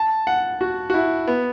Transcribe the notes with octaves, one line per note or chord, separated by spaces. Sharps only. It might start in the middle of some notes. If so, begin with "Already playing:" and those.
Already playing: A5
F#5
F#4
F#4
E4
B3